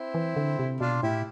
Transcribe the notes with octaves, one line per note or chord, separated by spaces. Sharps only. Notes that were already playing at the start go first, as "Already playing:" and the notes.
Already playing: C4 E4
E3
D3
C3
B2 D4 F4
A2 E4 G4